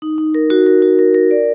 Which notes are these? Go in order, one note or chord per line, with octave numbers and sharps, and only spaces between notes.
D#4
D#4
A#4
F#4
A#4
F#4
A#4
A#4
D5